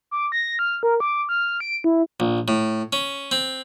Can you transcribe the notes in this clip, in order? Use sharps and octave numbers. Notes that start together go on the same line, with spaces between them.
D6
A#6
F6
A#4
D6
F6
D7
E4
A#1
A2
C#4
C4